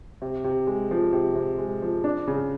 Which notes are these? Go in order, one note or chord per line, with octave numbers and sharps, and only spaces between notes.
C3
C3
G#3
F3
C3
C3
G#3
F3
D4
C#3